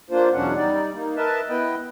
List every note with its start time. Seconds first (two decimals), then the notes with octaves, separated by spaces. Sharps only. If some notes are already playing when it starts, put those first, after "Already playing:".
0.10 A#3 D4 F4 C5
0.34 E2 B2 F#3 C#4 D4 F#5
0.55 G3 D#4 D5
0.93 A#3 D#4
1.17 A#4 B4 D#5 E5 A5
1.49 B3 E4 B4 D#5 G5